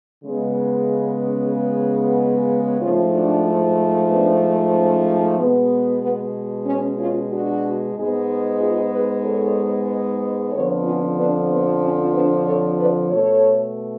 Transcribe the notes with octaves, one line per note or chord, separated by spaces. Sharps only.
C#3 G#3 B3
G#2 F3 A3 C#4 F4
D4 F#4
B3 D4
C#4
B2 G#3 B3
B3
C#4
C#4 F4
D4 F#4
G#2 G#3 B3
F4 G#4
G#4 B4
A4 C#5
F2 D3 F3 B3 A4 C#5
C#4 F4
B3 D4
B3
C#4
B3 D4
A4 C#5
B4 D5
B2 A3 A4 C#5